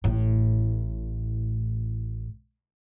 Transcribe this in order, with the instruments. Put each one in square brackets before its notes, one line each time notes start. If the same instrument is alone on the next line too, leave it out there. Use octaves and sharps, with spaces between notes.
[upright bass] A1 A2